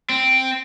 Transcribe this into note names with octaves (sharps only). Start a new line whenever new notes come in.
C4